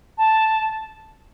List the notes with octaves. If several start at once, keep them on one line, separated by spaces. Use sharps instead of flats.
A5